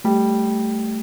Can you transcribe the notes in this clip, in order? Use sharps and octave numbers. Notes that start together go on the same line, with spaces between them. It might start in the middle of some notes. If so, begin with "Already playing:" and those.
G3 A3
A3